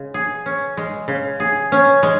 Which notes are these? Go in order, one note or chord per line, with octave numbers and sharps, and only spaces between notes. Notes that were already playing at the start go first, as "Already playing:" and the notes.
Already playing: C#3 G#3
G#4
C#4
G#3
C#3
G#4
C#4
G#3